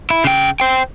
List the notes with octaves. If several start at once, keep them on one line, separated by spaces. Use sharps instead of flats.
E4
C#3 G5
C5 G5